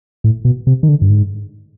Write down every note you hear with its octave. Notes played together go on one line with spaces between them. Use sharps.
A2
B2
C3
D#3
D3
G2
G#2